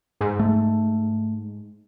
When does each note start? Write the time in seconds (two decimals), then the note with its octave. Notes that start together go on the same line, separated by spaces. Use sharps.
0.21 G#2
0.39 A3